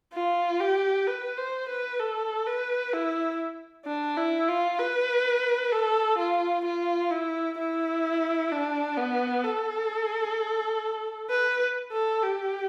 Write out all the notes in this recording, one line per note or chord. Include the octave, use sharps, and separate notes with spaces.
F4
G4
B4
C5
B4
A4
B4
E4
D4
E4
F4
B4
A4
F4
F4
E4
E4
D4
B3
A4
B4
A4
G4